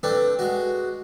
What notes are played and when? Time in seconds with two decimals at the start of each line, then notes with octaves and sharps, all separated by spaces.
0.03 A3 C4 D4 B4
0.39 G#3 F#4